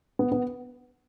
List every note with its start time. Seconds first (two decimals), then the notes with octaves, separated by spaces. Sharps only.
0.19 B3
0.32 B3